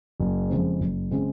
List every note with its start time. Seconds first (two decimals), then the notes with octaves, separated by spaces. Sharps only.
0.20 F#1
0.49 F2 C#3 G#3 C4
0.80 F#1
1.11 C#3 G#3 C4